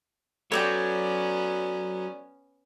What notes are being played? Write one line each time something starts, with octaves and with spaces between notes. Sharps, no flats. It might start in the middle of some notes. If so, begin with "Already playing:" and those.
F#3 B3 C#4 A4 C#5 D5 G5 G#6